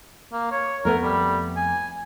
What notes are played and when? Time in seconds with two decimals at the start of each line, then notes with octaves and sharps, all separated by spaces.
0.32 A#3
0.51 C#5
0.85 F2 A3 B3 A#4
1.04 G3
1.57 G#5